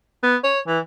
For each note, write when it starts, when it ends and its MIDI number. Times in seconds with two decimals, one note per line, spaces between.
0.23 0.36 59
0.44 0.59 73
0.67 0.79 52